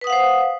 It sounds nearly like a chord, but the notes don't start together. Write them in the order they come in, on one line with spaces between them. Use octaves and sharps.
B4 D#6 F#5 F5 C5